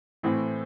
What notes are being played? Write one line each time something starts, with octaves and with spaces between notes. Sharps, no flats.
A2 E3 A3 C4 E4